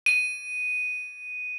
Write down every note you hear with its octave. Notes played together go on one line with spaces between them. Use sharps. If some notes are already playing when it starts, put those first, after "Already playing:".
D#7